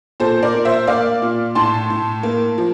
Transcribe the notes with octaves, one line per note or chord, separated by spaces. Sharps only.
A#2 A4 C5
A#4 D5
A#2
C5 E5
A#3 D5 F5
A#2
A2 A5 C6
A2
A#3
F3